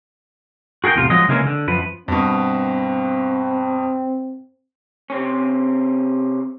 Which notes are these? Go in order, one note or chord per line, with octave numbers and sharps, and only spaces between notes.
F#4 G#4 A#4 F#5 G5
E2 A2 C3 F4
F3 F#3 G#3 D#5
C#3 E3 G#3 A#3 C#4
D3
F#2 F3 B4
G2 B2 C4
C3 C4 C#4